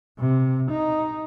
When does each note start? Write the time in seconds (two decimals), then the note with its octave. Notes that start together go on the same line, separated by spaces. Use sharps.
0.19 C3
0.70 D#4